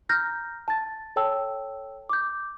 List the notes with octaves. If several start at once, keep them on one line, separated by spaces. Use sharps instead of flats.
A#5 F6 G6 A#6
A5 A6
A4 C#5 G5 A5 E6
D6 G6